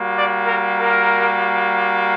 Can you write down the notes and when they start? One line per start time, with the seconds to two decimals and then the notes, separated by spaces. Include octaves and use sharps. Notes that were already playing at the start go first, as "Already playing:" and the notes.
Already playing: G3 A#3 F#4
0.16 D5
0.46 A#4
0.75 A#4